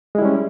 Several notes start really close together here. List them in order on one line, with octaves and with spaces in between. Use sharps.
G#3 E4 G3 C#4